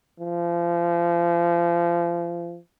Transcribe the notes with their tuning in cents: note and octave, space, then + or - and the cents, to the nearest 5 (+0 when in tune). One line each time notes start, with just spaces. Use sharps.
F3 -30